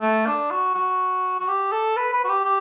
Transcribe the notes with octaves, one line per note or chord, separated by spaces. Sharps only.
A3
D4
F#4
F#4
F#4
G4
A4
B4
B4
F#4
G4
G4